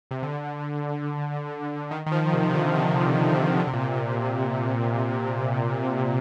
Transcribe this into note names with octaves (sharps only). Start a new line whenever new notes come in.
C3
D3
D#3
D#3
F3
C3
D#3
D3
C3
C3
C3
D3
D3
C3
A#2
C3